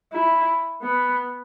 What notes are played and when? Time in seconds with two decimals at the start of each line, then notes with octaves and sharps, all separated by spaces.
0.13 E4
0.82 B3